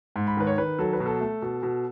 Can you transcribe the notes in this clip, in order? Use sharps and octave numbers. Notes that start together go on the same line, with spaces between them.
G#2
B5
D#3 B4
C#5
D#3 B4
F#3 A4
B4
B2
A4
A3
B2
B2